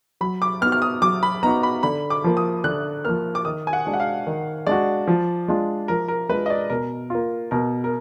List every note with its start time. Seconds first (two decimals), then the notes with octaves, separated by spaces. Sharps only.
0.21 F#3 B5
0.42 D6
0.61 B3 D#4 F#4 F6
0.72 F6
0.82 D#6
1.01 F#3 D6
1.23 B5
1.43 B3 D#4 F#4 A#5
1.63 B5
1.83 D3 B5
2.10 D6
2.24 F3 A#3
2.37 D#6
2.64 D3 F#6
3.05 F3 A#3 F6
3.35 D6
3.45 D#3 D#6
3.67 G#5
3.73 F#5
3.86 G#3 D4 F#4
3.94 F#5
4.00 F5
4.27 D#3
4.67 G#3 D4 F#4 D5
5.07 F3
5.48 G#3 D4 F4
5.88 F3 A#4
6.08 A#4
6.29 G#3 D4 F4 B4
6.46 D#5
6.50 D5
6.70 B2 A#4
7.10 A#3 F4
7.51 B2 A#4
7.84 A#4